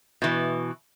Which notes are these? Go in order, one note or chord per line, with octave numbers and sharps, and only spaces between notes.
B2 E3